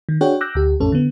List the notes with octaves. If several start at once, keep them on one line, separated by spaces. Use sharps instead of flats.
D#3
D4 F#4 G#4 C#5 F#5 G5
D6 E6 F#6 G6 A#6
D2 G4
A1 F2 A2 C#4 A4
D3 B3